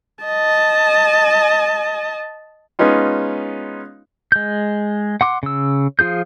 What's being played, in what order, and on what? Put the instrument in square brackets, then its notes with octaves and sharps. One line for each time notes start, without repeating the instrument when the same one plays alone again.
[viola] D#5 A5
[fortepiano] G#3 B3 C#4 D#4 F4
[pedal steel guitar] G#3 G6
F#5 C6 D6
C#3 E6
F3 F4 G#4 G6